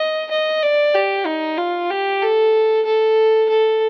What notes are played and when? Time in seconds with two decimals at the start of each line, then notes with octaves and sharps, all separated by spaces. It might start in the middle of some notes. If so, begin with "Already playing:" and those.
Already playing: D#5
0.31 D#5
0.63 D5
0.95 G4
1.26 D#4
1.57 F4
1.90 G4
2.22 A4
2.86 A4
3.49 A4